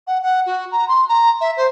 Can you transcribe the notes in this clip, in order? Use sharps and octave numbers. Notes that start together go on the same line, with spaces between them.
F#5
F#5
F#4
A#5
C6
A#5
E5
C5